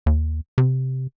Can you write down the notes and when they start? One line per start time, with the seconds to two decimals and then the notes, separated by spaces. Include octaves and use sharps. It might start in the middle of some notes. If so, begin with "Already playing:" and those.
0.06 D#2
0.58 C3